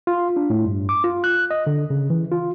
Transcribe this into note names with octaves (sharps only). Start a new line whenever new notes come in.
F4
D4
A2
G2
D6
F4
F#6
D#5
D3
C#3
E3
F4